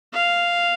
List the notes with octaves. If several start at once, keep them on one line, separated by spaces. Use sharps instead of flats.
F5